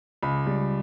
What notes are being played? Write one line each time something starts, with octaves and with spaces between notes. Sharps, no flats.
C#2 B5
G3